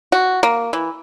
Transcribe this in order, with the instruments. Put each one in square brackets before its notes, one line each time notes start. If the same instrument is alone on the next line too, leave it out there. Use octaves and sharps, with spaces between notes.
[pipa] F#4
A#3
E3